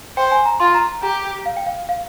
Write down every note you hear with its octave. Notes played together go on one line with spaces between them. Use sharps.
C5 G5
G#5
A#5
F4 C6
A#5
G4 A#5
F5
G5
F5
F5